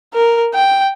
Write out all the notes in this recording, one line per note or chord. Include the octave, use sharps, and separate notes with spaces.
A#4
G5